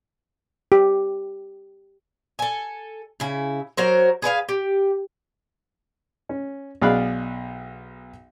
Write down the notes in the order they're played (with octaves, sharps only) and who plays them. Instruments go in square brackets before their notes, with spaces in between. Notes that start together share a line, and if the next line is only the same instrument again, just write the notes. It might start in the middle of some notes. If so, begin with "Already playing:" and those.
[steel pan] G4
[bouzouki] A4 G#5
C#3 E4
F#3 A#4 C5
G#4 B4 D5 F5
G4
[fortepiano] C#4
B1 G#4 D5 F5 B5 F#6